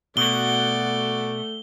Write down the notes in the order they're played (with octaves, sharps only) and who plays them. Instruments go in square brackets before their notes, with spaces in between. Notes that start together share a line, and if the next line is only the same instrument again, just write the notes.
[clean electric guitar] B2 F#4 [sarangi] A3 [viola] D5 F#5 [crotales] G7